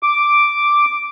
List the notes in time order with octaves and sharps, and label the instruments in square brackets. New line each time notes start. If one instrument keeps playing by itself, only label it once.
[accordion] D6